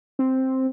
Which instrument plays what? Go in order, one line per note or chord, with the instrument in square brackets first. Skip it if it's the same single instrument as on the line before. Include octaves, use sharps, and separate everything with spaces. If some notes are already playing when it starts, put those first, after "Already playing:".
[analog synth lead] C4